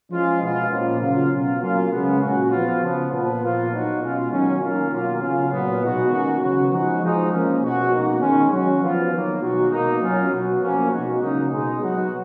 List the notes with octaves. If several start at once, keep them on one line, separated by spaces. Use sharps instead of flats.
F3 G#3 C#4 F4
B2 G#3 B3 F4
A#2 F3 A#3 C#4 F4
C#3 F#3 A#3 F4
B2 F#3 C#4 F4
F#3 A#3 C#4 F4
C#3 G#3 B3
A#2 F#3 C#4 F#4
F3 B3 F4
C#3 F3 B3
A#2 F3 B3
A#2 F3 A#3 F4
F#3 B3 D#4 F#4
B2 G#3 C#4 F4
D#3 F#3 C#4
D#3 A#3 C#4 F4
B2 F#3 A#3 F4
C#3 F#3 C#4 F4
A#2 F#3 B3
B2 G#3 D#4 F#4
D#3 A#3 C#4 F#4
C#3 F#3 B3 F#4
F3 G#3 D#4 F#4
F3 G#3 D#4
F3 A#3 C#4
B2 G#3 C#4 F#4
B2 A#3 D#4 F#4
D#3 G#3 C#4
F#3 C#4 F#4
F3 B3 F4
D#3 F#3 A#3
B2 G#3 D#4 F#4
B2 A#3 D#4
F#3 C#4 F4
B2 F#3 B3 F#4
F3 A#3 C#4
B2 G#3 D#4 F#4
C#3 F#3 A#3 D#4
B2 G#3 D#4
F#3 B3 F#4